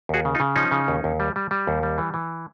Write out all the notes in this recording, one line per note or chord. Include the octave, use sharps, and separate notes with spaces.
D#2 F#4 G#4
C#3
D#4 F4
C#3
F3 C#4 D#4
C#3
D#2
D#2
G3
G3
G3
D#2
G3
E3
E3